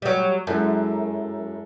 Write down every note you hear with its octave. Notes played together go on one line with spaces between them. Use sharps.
F#3 G3
F#2 G#3 E4 A4